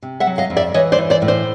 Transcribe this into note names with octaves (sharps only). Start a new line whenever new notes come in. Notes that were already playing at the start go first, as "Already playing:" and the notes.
C3
E5 F#5
F#3
D#5 F5
F2
D5 E5
E3 C#5 D#5
C5 D5
E3
C5 D5
A2
C5 D5